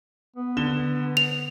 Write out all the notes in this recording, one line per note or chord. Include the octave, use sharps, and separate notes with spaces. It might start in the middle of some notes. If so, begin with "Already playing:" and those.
B3
D3 E7 G7
F7